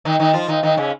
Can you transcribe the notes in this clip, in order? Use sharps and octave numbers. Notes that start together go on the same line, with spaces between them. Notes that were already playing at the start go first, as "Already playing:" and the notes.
D#3 D#4
D#3 D#4
F3 F4
D#3 D#4
D#3 D#4
C#3 C#4